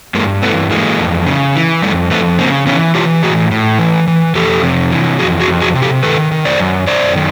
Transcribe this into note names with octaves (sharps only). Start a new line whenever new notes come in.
G2 G#3 A#3
E3 A3 B3
E3 G#3 A#3
F2
C#3
E3
F2 G3 A3
F2 A3 B3
C#3 A#3 C4
E3 B3 C#4
E3 F4 G4
A2 F#4 G#4
A2
E3
E3
F2 G4 A4
C3
E3
F2 F#4 G#4
F#4 G#4
F2
F#4 G#4
C3
G4 A4
D#3 A4 B4
D#3
C5 D5
F#2
F#2 C5 D5
D#3